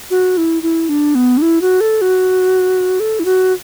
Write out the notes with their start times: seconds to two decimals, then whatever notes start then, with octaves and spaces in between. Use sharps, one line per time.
0.10 F#4
0.37 E4
0.63 E4
0.89 D4
1.15 B3
1.38 D4
1.42 E4
1.62 F#4
1.81 A4
2.02 F#4
3.00 A4
3.20 E4
3.25 F#4